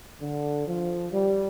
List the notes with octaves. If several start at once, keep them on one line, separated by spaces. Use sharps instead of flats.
D3
F3
G3